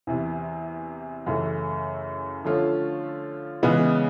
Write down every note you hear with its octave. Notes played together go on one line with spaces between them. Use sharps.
E2 C3 E3
F#2 C#3 E3 A3
D3 F3 A3 C#4 F4
C#3 E3 G#3 B3